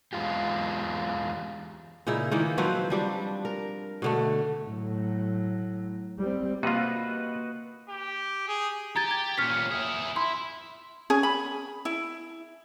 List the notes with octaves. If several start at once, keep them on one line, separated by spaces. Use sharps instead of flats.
E2 G#2 G#3 F4 G4
A#2 C#3 D#4 E4
D#3 E3 A#3 D#4
F3 F#3 C4 B4
F3 G3 D4
A#4
B2 D3 A3
A2 F#3
G3 C4
C3 A#3 F4 F#4 B4 D#5
G4
G#4
G4 A#5 G#6 A6
G#6
A#2 C#4 F6 B6
E4 G#4
E4 C6
C#4 G#4
B5
E4